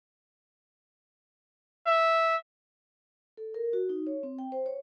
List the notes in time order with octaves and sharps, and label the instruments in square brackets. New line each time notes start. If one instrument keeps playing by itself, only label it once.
[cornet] E5
[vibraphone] A4
A#4
F#4
D#4
C#5
C4
G5
C5
C#5